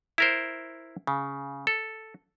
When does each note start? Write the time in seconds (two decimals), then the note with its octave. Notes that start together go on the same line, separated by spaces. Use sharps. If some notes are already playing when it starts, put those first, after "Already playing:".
0.18 E4 A#4 C5
1.07 C#3
1.67 A4